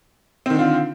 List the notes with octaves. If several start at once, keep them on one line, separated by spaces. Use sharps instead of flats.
D3 D#3 C4 F4